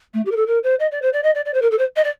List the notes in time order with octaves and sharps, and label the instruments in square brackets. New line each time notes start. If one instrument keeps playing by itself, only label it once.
[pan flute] A3
G4
A#4
A4
A#4
C5
D#5
D5
C5
D5
D#5
D5
D5
C5
A#4
A4
C5
D#5
D5